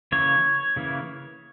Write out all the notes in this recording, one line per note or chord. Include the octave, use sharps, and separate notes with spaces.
C#3 E3 A#3 C#5
C#3 E3 A#3